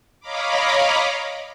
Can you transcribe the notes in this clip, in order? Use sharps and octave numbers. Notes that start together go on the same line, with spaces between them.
C#5 D#5 F5 A#5 B5 D6